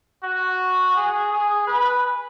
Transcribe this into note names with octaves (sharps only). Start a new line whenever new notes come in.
F#4
G#4
G#4
B4